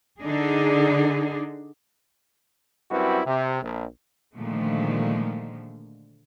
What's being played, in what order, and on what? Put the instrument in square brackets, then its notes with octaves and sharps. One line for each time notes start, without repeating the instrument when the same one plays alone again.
[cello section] D3 D4 D#4 G#4
[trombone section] F#2 G3 C4 E4 F#4 B4
C3
A#1
[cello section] A#2 D3 D#3 F3 G#3 A3